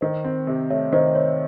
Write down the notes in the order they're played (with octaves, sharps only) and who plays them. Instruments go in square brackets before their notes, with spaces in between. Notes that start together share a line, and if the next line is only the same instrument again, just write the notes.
[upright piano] D#3 [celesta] C5 D#5
[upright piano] C4
C3
[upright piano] A3 [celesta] C#5 E5
[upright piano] D#3 [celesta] C5 D#5
[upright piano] C4 [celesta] C#5